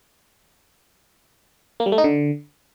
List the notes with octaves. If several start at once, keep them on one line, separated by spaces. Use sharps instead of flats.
A#3
G3
A3
D#4
D3